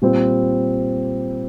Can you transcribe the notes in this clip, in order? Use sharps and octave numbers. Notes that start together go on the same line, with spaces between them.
A#2 G3 C4